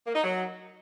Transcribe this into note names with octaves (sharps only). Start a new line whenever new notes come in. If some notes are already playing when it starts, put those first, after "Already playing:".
A#3
D#4
F#3